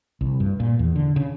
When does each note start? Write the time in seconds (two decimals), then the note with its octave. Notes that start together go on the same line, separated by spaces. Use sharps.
0.21 C2
0.40 G2
0.60 A#2
0.79 E2
0.96 D3
1.16 C#3